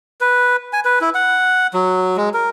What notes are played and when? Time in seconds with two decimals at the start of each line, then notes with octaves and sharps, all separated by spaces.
0.21 B4
0.73 G#5
0.85 B4
1.01 E4
1.15 F#5
1.74 F#3
2.17 G#3
2.34 A#4